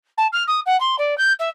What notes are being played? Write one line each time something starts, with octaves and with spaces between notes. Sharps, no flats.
A5
F6
D#6
F#5
C6
D5
G6
E5